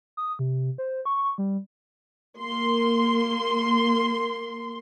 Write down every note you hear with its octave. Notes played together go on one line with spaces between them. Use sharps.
D#6
C3
C5
C#6
G3
A#3 C6